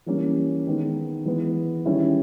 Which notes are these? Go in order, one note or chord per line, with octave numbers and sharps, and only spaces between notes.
E3 G3 A#3 C#4
D#3 G#3 B3 D#4
E3 G#3 B3
D#3 G3 C#4 E4